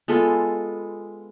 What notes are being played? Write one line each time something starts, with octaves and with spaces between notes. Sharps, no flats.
G#3 B3 F4 A4